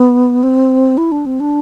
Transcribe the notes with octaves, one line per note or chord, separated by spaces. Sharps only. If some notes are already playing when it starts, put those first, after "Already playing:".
Already playing: B3
C4
E4
D4
C4
D4